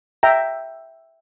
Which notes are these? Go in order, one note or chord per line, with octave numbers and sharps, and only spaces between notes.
E5 G5 A#5